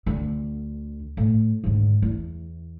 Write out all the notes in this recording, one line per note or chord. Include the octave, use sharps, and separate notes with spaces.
D2 D3
A2
G#2 D3
E2